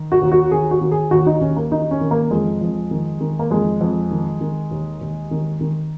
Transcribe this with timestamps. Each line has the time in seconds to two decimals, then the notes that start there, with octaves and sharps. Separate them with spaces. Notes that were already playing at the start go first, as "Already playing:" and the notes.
Already playing: D#3
0.12 F#4
0.22 D#2
0.32 F#4
0.51 D#3 G#4
0.71 F#4
0.81 D#3
0.91 G#4
1.11 D#2 F#4
1.26 D#4
1.41 D#2 C#4
1.56 A#3
1.72 D#3 D#4
1.91 C#4
2.01 D#3
2.11 A#3
2.31 F2 G#3
2.61 F2
2.91 D#3
3.21 D#3
3.39 A#3
3.50 F2 G#3
3.81 F2
4.11 D#3
4.41 D#3
4.71 D#2
5.01 D#2
5.31 D#3
5.61 D#3